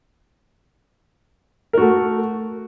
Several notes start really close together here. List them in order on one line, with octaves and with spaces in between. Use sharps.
A#4 F#4 A3